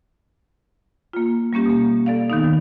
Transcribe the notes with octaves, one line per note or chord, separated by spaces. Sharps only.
A#3 F4
G3 A#3 C#4 G4
B2 A#3
A4 D5 F5
D#3 B3 D#4